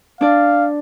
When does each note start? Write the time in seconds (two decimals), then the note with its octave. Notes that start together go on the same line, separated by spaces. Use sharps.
0.21 D4 D5 F5